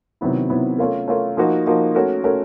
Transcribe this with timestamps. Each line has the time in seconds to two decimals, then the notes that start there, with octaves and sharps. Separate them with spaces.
0.21 C3 D#3 F#3 B3 E4
0.50 C3 D#3 F#3 B3 E4
0.78 A3 C#4 F4 A#4
1.08 A3 C#4 F4 A#4
1.37 F3 A#3 D#4 F#4
1.66 F3 A#3 D#4 F#4
1.95 A3 C#4 F#4 A#4
2.24 A3 C#4 F#4 A#4